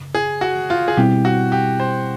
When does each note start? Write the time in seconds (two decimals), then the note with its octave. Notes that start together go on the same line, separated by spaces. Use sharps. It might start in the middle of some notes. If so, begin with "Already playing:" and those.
Already playing: F#2 C#3
0.15 G#4
0.41 F#4
0.70 F4
0.88 G#4
0.97 B2 G3 C4 E4 G4
1.25 F#4
1.52 G4
1.80 C5